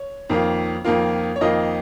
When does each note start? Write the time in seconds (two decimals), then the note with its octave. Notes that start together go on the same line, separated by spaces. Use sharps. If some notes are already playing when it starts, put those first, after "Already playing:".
Already playing: C#5
0.29 F2 D#3 A#3 F4
0.85 F2 D#3 A#3 F4
1.36 C#5
1.41 F2 D#3 A#3 F4 D#5